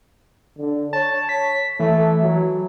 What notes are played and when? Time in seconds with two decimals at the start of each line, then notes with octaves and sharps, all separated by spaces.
0.58 D3
0.93 C#5 A5
1.29 B6
1.80 E3 A3
2.22 F#3